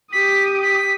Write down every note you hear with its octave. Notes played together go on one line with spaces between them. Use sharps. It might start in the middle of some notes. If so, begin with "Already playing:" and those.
G4 D#6 B6
B6